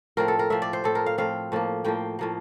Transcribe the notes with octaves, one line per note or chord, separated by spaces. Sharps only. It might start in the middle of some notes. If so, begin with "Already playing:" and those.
A2 F3 C4 A#4
A4
A#4
A2 F3 C4 E5
D5
C5
A2 F3 C4 A4
A#4
F5
A2 F3 C4 F5
A2 F3 A#3
A2 F3 A#3 G5
A2 F3 A#3